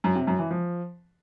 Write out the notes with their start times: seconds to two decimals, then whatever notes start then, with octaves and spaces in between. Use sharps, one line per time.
0.04 F#2
0.16 C3
0.27 F#2
0.39 E3
0.50 F3